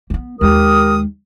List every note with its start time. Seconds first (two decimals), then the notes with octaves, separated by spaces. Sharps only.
0.10 A#3 B3
0.41 D#2 G#3 G4 A#4 D#6